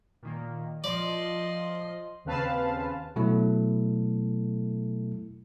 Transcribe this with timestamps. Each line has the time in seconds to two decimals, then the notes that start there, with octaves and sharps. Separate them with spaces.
0.23 A#2 D#3 A#3
0.84 F3 D5 D#5 C6
2.25 D#2 C#3 C4 B4 F5 A5
3.16 B2 F#3 A3 E4 A4